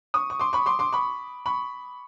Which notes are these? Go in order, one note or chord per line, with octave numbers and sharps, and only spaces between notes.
C#6 D#6
C#6
C6 D6
B5 C#6
C6 D6
C6 D6
B5 C#6
B5 C#6